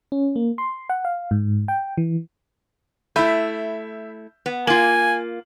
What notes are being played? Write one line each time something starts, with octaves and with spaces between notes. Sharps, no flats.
C#4
A#3
C6
F#5
F5
G#2
G5
E3
A3 E4 E5 B5 G6
B3
A#3 F4 G#5 F#7